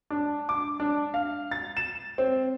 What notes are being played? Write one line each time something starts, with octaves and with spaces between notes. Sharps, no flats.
D4
D6
D4
F5
A6
E7
C4